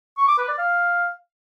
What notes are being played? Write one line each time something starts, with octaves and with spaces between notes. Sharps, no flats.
C#6
D6
B4
D5
F5